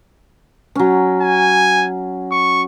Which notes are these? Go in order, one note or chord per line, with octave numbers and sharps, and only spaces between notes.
F#3 C#4
G#5
C#6